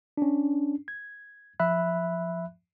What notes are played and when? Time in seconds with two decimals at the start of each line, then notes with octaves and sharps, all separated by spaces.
0.17 C#4 D4
0.88 G#6
1.60 F3 E5 B5 F#6